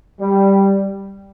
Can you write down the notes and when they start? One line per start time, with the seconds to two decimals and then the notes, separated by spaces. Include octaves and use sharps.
0.19 G3